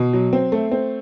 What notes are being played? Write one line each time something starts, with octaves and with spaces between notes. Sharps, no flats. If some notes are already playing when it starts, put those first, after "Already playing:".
Already playing: B2
F#3
C4
A3
C4